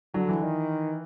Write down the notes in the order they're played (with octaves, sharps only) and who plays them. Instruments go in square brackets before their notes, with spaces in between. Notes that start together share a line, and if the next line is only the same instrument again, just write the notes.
[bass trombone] D3 [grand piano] F#3
[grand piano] E3
[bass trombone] D#3